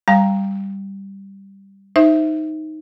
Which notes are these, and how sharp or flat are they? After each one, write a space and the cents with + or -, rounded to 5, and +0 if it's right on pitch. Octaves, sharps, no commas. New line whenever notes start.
G3 +0 F5 +0 A#5 +0
D#4 +0 C5 +0 E5 +0